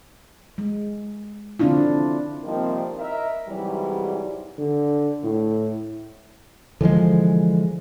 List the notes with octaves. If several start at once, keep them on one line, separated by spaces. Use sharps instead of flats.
G#3
D3 C4 D4 E4 F4
C3 D#3 F3 G3 A#3 C4
E4 A#4 D#5 E5
G#2 C3 E3 F#3 G3
D3
A2
D3 E3 F3 G#3